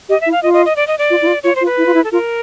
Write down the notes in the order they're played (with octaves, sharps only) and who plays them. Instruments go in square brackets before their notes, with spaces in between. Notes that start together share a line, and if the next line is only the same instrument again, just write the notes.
[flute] G4 [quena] D#5
[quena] E5
[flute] E4
[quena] F5
[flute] F4 [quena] D#5
[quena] D#5
D#5
D5
D#5
D5
[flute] F4
E4
F4
[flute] F4 [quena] C#5
[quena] C5
[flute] F4
[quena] B4
[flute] E4
F4
E4
[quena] A4
[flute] F4 [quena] A#4